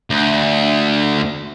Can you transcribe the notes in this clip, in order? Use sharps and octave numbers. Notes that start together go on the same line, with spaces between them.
D2